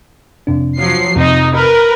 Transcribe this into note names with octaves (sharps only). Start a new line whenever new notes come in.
F2 C3 D4
F3 F#3 C7
F2 C3 D#4
A#4 B4